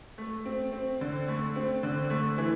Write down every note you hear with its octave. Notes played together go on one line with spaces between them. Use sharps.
A3
C4
C4
D3
A3
C4
D3
A3
E3